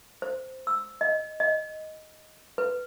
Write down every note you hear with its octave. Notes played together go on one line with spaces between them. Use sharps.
C5
E6
D#5
D#5
B4